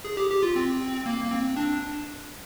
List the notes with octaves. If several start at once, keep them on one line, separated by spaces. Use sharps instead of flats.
G#4
G4
G4
F4
C4
A#3
A#3
C4
D4